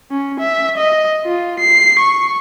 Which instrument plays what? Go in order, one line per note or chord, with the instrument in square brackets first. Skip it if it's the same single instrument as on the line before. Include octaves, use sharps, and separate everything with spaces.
[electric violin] C#4
E5
D#5
F4
C7
C#6